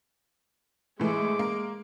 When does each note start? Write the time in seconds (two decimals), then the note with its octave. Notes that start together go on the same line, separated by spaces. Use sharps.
1.00 A2 E3 G#3 A3 D6
1.39 A#3